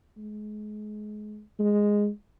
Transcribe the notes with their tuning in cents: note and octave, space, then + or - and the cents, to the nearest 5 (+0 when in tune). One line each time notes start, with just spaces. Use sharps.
G#3 +30
G#3 -5